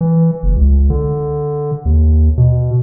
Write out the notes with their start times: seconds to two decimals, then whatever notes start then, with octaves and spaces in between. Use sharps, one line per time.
0.01 E3
0.43 F#1
0.56 C#2
0.90 D3
1.85 D#2
2.38 B2